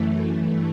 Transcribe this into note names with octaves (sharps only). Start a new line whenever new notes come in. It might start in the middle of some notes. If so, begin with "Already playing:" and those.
Already playing: F#2 E3 A3
G2 E3 A3